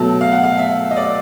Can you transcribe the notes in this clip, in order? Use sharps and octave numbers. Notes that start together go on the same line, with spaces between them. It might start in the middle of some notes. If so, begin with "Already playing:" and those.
Already playing: B2 F#3 A3 A5
F5
F#5
F5
E5
D#5
D5